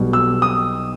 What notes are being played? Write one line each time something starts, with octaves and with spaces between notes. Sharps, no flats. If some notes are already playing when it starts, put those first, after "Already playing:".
Already playing: B1 B2 G3
E6
D#6